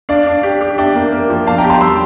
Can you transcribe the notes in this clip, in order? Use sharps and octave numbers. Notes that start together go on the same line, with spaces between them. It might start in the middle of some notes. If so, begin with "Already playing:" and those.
D4 D5 F5
D4
G4
G4
D4 E5 G5
A#3
A#3
F3
D4 F5 A5
G5 A#5
G4
A5 C6
G3 C6 E6